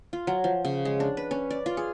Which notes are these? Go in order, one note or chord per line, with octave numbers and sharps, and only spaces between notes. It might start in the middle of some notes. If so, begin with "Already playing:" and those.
F4
F#3
F3
C#3
G#3
D4
B4
C#4
D5
F4
G#4